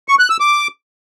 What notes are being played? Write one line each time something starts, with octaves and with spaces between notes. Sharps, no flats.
C#6
F#6
E6
D6